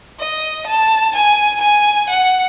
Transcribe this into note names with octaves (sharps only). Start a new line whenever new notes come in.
D#5
A5
G#5
G#5
F#5